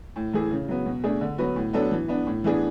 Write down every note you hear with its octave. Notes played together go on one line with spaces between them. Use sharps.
A2
E3 A3 E4 G#4
C#3
F#3 B3
B2
A3 D4 G#4
D3
F#3 B3 F#4 B4
A2
F#3 B3 D4 A4
E3
B3 D4
A2
E3 B3 D4 G#4